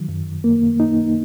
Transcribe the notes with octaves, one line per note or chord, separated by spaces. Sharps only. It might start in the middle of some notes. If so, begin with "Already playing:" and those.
Already playing: D#3 F#3
F#2
A#3
D#4